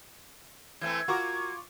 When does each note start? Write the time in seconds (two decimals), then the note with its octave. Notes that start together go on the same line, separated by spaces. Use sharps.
0.81 E3 A3 C4 G#6
1.08 F4 F#4 A#4 C#6 D6